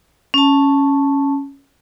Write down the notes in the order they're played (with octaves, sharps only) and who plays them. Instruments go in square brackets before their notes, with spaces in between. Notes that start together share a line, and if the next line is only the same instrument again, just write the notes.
[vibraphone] C#4 A5